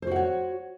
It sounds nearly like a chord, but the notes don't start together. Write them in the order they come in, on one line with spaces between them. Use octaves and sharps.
C5 F#4 F#5 C#5